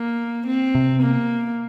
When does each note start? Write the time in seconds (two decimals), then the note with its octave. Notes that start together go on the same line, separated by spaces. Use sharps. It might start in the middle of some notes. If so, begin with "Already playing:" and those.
Already playing: A#3
0.47 C4
0.75 C3
1.02 A#3